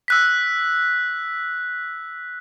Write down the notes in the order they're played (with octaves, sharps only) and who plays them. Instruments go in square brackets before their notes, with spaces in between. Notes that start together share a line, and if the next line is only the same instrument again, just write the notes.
[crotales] E6 F#6 B6